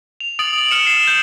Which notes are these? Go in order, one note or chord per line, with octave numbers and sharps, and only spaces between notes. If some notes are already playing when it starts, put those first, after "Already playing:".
F7
D#6 A6 D7 F#7
F6 C#7 E7
C7 E7
G6